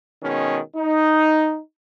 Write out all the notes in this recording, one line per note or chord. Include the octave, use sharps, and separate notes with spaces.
B2 D#3 G#3 C#4
D#4